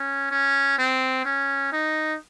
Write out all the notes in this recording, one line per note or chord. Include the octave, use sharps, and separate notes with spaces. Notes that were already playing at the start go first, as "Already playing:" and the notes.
Already playing: C#4
C#4
C4
C#4
D#4